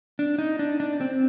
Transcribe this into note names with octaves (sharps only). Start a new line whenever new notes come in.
D4
D#4
D4
D4
C4